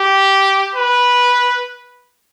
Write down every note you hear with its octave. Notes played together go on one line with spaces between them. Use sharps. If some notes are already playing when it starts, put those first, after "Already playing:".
Already playing: G4
B4